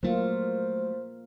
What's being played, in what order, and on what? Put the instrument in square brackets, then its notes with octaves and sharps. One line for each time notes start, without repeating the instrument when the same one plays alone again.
[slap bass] F#3 A3 [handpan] A#3 F4 [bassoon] C5